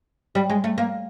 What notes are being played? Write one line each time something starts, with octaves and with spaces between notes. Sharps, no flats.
G3
G#3
A3
A#3